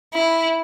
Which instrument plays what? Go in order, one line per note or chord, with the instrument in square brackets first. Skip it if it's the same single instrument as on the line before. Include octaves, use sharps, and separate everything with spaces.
[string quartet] E4